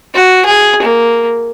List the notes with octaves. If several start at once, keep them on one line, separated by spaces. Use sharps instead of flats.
F#4
G#4
A#3